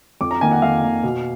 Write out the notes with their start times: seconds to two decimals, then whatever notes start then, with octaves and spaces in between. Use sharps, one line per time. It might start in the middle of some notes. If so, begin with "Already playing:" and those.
0.21 F2 D6
0.31 A#5
0.41 D#3 A#3 G#5
0.51 F#5
0.62 F2 F5
0.82 D#3 A#3
1.03 B2